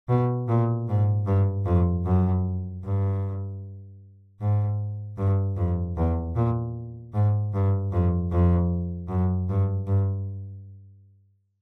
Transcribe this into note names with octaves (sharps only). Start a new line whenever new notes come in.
B2
A#2
G#2
G2
F2
F#2
G2
G#2
G2
F2
E2
A#2
G#2
G2
F2
F2
F#2
G2
G2